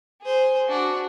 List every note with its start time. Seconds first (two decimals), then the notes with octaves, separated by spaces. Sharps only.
0.22 G#4 C5
0.69 D4 F#4